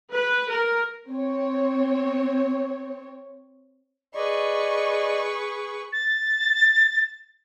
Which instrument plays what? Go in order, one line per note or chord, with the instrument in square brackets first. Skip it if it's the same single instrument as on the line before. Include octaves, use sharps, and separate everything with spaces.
[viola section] B4
A#4
[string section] C4 C#5
[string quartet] G#4 B4 C#6 [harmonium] D5 D#5
[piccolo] A6